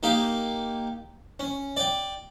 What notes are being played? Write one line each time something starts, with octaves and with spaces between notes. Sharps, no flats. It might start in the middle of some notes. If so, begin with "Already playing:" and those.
A#3 D#4 G4 F5
C#4
D5 G5